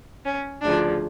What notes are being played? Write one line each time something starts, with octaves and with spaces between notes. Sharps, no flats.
C#4
D2 C#3 F3 D4